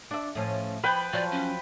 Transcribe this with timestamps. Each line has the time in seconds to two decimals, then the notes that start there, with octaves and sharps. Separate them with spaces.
0.11 D4 E5
0.35 A2 F3 C#4
0.84 F3 B4 G5 B5
1.13 F3 F#3 F#4 D5
1.32 C#4